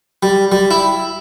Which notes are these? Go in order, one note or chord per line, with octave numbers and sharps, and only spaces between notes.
G3
G3
E4